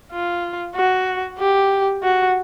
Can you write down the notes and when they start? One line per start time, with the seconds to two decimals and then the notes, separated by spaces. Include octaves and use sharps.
0.12 F4
0.75 F#4
1.39 G4
2.03 F#4